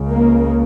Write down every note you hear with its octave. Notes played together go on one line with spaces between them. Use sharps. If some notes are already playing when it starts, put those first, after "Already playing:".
Already playing: C#2 C#3
A#3